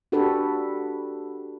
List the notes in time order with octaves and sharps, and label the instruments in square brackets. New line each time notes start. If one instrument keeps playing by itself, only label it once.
[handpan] D4 F#4 G4 A4 B4